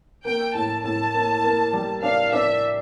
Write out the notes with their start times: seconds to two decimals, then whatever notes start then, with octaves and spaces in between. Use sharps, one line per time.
0.25 A#3 G5
0.54 A2 A5
0.84 A2 A5
1.14 A#3
1.44 A#3
1.73 G3
2.03 D4 F5
2.33 D4 E5